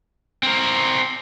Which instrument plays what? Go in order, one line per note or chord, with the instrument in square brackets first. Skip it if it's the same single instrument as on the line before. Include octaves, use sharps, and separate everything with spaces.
[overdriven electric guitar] C4 A#4